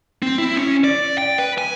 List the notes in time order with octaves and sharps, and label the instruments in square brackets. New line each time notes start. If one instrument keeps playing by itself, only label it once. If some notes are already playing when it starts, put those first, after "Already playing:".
[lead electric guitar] C4
E4
C#4
D5
G5
B4
G#5